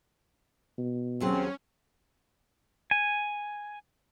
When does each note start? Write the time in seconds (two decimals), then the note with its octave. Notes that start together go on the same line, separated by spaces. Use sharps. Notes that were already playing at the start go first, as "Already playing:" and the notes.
0.78 B2
1.20 D#2 F#3 C4 C#4 G#4
2.91 G#5